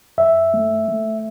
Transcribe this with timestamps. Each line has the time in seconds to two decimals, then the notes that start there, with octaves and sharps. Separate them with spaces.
0.18 F#2 E5
0.54 A3
0.88 A3